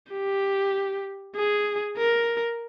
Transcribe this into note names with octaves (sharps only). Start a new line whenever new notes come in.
G4
G#4
A#4